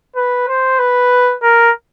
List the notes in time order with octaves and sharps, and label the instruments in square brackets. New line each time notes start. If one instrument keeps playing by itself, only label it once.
[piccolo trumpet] B4
C5
B4
A#4